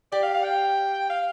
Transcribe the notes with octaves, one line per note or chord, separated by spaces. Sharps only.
G4 D5
F5
F5
G5
F5